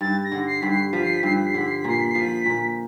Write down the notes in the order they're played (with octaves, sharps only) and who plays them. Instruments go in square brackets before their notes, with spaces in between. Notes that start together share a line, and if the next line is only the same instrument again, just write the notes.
[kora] G2 [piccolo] A6
[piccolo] A#6
[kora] D3
[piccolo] C7
[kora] G2 [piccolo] B6
[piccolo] C7
[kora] F3 [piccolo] B6
[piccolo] C7
B6
[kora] G2 [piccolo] C7
[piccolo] B6
C7
[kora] D3 [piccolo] B6
[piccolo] C7
B6
[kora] A#2 [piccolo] C7
[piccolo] B6
[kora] F3 [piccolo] C7
[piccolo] B6
[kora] A#2